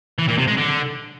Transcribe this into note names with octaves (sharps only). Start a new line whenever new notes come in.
E3
A#2
C3
G#3
D3